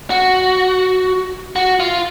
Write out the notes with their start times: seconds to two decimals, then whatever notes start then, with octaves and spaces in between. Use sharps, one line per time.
0.10 F#4
1.56 F#4
1.80 F4